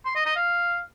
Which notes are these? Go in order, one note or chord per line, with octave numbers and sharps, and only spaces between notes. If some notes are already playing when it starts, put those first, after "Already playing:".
C6
D#5
D#5
F5